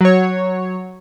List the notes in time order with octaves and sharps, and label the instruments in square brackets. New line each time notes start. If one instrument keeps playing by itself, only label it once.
[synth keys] F#3 C#5